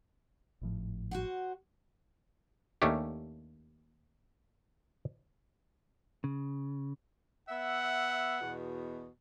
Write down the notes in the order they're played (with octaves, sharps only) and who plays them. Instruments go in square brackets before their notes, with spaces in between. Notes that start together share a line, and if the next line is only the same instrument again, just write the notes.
[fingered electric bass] G#1 A2 F3
[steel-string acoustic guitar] F#4 C5 F#5
[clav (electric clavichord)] D#2 A3 C#4 D4 G4
[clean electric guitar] C#3
[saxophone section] B3 E5 [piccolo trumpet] F#5
[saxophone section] E2 B2